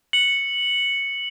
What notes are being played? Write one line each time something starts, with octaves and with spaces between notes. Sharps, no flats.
C#7 F#7